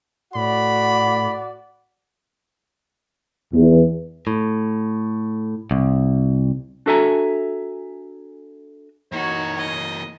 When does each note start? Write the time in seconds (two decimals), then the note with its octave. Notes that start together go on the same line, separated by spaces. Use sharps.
0.35 A2 F#4 D5 B5
3.53 E2
4.27 A2
5.71 C2
6.86 D4 F#4 A4 E5 G#5 A#5
9.12 E3 A#3 D#4 F#4 C#5
9.58 D#5